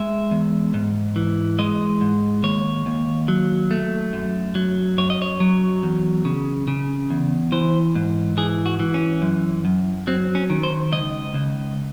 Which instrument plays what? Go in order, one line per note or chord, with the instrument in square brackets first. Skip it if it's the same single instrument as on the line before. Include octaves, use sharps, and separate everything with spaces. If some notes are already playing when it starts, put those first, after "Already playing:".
Already playing: [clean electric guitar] G#3 E5
E2
G#2
E3
G#3 D#5
G#2
D#2 C#5
D#2
F#3
A3
F#2
F#3
F#2 C#5
D#5
C#5
F#3
E2
C#3
C#3
E2
E3 C5
G#2
E3 G#4
F#4
E3
C#4
F#2
F#2
F#3 C4
C#4
D#3
C5
C#2 D#5
C#2